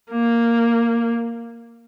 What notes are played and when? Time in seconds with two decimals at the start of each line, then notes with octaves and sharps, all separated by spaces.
0.11 A#3